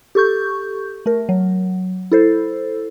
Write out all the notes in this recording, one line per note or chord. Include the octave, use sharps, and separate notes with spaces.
G4 A4 C#6 G6
A3 A#4
F#3
E4 A4 C5